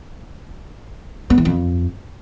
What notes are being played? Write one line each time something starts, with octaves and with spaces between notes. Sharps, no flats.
B3
E3
F2